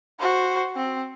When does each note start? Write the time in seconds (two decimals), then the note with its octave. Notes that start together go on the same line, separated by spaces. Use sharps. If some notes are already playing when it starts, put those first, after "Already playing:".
0.20 F#4 C5
0.76 C4